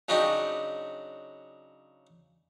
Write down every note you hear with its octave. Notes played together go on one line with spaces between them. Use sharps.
C#3 F#3 D4 D#4 F#4 G4